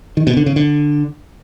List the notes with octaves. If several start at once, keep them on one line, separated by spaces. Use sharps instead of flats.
D#3
B2
D3
C#3
D3